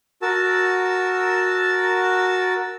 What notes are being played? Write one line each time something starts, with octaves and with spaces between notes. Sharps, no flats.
F#4 A#4 A5 E6